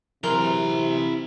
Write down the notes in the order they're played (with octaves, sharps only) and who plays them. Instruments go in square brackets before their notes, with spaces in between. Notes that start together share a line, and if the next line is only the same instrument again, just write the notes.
[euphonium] C3 [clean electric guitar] E3 F#3 G#4 [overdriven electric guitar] E4 C6 [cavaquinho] A#4